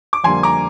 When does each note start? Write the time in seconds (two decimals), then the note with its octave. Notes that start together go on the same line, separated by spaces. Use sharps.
0.13 D6
0.24 F2 D3 G3 A#3 G#5 C6
0.43 A#5 D6